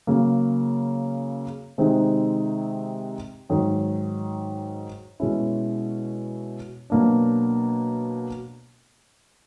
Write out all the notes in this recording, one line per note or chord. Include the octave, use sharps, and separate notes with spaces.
C#3 F#3 A#3 C#4
C3 D#3 G#3 C4 D#4
G#2 D#3 F#3
B2 G#3 C#4 E4
B2 F#3 A#3 D4